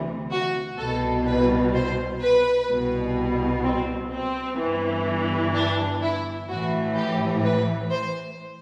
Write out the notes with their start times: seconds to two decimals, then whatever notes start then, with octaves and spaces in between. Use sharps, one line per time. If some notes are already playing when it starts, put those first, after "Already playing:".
Already playing: D2 C3 E3
0.31 F#4
0.77 C2 B2 A4
1.26 B4
1.74 C5
2.21 B4
2.68 C2 B2
3.63 C4
4.11 C4
4.58 G1 G2 E3
5.54 D4
6.02 E4
6.49 A1 A2 E3 F#4
6.96 G4
7.44 B4
7.91 C5